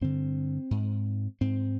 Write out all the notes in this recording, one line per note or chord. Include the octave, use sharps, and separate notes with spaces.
G2 D3 C4
G#2
G#2 C4